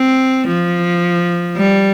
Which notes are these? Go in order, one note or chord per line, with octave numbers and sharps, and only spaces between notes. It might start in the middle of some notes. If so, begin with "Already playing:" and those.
Already playing: C4
F3
G3